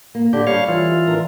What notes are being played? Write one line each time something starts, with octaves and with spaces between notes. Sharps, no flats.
A#3
D3 G4
G3 C#5 F5
E3 F4
D4 A#4